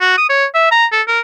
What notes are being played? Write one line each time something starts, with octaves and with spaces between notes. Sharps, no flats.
F#4
D#6
C#5
E5
A#5
A4
A#4